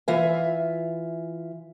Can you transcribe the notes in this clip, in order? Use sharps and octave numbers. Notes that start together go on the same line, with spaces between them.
E3 F4 E5 G#5